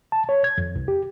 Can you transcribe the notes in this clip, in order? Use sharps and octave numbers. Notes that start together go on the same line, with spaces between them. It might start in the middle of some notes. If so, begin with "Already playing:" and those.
A5
C#5
G#6
F2
C2
G4